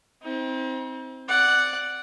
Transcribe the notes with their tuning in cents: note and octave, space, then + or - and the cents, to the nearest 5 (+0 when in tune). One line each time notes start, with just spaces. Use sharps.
C4 +0 D#4 +45
D5 +0 F#5 +0